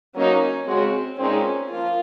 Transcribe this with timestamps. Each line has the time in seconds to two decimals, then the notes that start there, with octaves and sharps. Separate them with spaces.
0.15 F#3 A#3 C#4 D#4
0.66 C#3 G#3 C4 C#4 F#4
1.19 A#2 G#3 C4 C#4 D#4
1.70 F3 A#3 F4